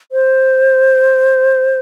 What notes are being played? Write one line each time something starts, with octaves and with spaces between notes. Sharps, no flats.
C5